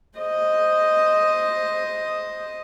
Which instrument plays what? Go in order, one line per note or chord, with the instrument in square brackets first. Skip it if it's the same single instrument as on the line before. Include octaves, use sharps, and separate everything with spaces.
[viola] C5 D#5